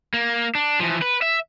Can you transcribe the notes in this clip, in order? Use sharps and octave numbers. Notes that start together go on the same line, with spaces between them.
A#3
D4
E3 F3
B4
E5